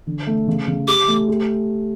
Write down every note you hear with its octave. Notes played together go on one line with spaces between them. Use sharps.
D3
A3
C#3
C#3
G4 D6
A3
G4